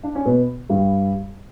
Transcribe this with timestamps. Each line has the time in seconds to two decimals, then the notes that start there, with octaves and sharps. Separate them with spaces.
0.03 D4
0.15 C#4
0.25 B2 B3
0.70 G2 G3